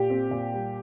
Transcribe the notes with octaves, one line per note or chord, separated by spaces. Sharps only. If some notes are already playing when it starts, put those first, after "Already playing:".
Already playing: A#2 G4
C4
A#2
G3